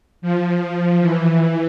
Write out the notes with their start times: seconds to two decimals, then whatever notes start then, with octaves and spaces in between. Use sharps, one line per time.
0.22 F3
1.01 E3